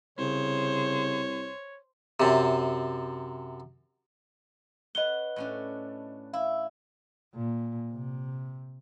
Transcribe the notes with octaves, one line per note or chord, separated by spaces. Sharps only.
C2 C#3 C5 C#5
F#2 C3
B4 C#5 D#5 F#5 G7
A2 C#4 D4
E4 F5
A#2
C3